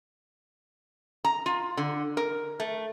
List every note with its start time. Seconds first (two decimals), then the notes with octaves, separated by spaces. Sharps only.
1.24 A#5
1.46 F4
1.77 D3
2.17 A#4
2.60 A3